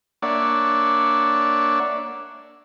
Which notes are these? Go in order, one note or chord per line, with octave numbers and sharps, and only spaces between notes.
A#3 D4 C#5 D5 E5 F#5